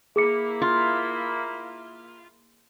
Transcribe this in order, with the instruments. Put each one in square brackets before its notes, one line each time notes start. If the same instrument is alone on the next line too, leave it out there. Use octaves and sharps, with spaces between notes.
[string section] A#3 E4 [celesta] G#4 D6 C#7
[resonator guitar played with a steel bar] F4